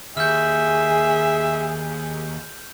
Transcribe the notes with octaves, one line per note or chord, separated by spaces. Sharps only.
D#2 G#4 E5 F6 G6